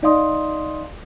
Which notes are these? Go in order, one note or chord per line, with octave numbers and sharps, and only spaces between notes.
D#4 D5 D#5 F5 C6 D#6